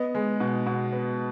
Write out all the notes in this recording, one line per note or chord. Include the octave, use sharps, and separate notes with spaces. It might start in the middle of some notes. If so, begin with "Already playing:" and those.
Already playing: B3 D#5
G#3
B2
B2
B3